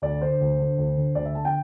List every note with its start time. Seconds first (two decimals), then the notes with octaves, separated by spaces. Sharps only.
0.02 D2 D5
0.21 D3 C5
0.40 D2
0.59 D3
0.78 D2
0.97 D3
1.15 D2 D5
1.25 E5
1.35 D3 A5
1.45 G5